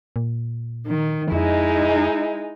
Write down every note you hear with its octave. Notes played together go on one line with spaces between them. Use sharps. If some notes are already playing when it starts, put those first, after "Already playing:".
A#2
D#3
F2 G#3 D#4 E4